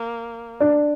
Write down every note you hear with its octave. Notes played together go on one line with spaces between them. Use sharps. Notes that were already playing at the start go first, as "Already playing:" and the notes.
Already playing: A#3
D4